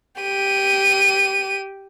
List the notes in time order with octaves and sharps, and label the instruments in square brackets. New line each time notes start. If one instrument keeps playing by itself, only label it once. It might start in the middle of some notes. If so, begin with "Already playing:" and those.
[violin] G4 D#7